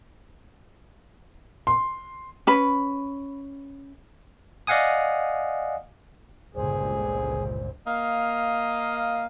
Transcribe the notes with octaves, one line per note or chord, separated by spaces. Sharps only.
C6
C#4 B4 B5
D5 D#5 F5 F#5 G#5 D#6
G1 C#2 A#2 G#4 C5
A#3 D#5 F5